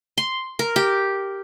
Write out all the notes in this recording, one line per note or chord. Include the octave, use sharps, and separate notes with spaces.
C6
A#4
G4